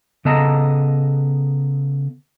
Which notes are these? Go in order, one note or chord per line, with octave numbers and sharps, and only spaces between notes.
C#3 B3 A4 D#5 A5 A#5